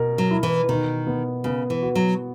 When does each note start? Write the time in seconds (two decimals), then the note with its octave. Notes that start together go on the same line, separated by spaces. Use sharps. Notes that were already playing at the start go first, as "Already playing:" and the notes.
Already playing: B2 A#4
0.18 F#3
0.31 E4
0.43 E3
0.69 B2 D#3
1.07 B3
1.44 C#3 B3
1.70 E3
1.82 F#4
1.95 F#3